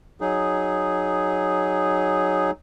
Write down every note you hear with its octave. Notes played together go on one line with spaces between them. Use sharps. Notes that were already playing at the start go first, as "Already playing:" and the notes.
F#3 D#4 G#4